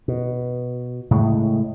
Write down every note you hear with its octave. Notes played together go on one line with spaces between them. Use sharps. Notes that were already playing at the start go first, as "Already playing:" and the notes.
B2
A2 C#3 G#3